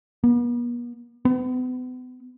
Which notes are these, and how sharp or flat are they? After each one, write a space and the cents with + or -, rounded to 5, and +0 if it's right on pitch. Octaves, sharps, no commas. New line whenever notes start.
B3 -45
B3 +35